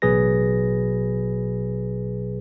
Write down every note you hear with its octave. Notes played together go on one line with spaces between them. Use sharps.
A1 B2 F#3 G#4 B4 A#6